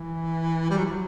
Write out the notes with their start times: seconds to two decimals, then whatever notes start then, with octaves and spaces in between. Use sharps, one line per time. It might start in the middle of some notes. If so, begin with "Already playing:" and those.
Already playing: E3
0.70 G3
0.77 F#3
0.85 E3
0.92 F#3